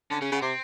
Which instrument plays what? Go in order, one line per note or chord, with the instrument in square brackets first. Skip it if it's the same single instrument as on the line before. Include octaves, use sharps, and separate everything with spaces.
[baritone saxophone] D3 [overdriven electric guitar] C#4
[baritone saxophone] C#3 [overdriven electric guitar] C#4
[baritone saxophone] C#3 [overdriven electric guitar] B3
[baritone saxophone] C3 [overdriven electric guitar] C4